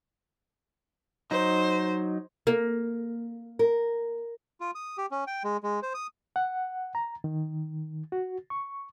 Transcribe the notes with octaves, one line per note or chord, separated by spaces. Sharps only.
F#3 D#4 C5
A#3
A#4
F4
D#6
G4
C#4
G5
G#3
G#3
C5
D#6
F#5
A#5
D#3
F#4
C#6